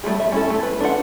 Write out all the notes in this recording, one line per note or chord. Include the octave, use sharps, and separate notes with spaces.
G3 A3 E4 G#4
E5
C#4 E4 A4
A3
B4
D4 F4 F#5